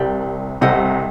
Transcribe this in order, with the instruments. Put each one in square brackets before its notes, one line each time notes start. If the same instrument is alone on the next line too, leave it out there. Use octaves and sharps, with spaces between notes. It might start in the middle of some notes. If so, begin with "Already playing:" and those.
Already playing: [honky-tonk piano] C2 C3 [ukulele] G4 A#4 D5
[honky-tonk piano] C2 C3 [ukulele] A4 C5 D#5 F#5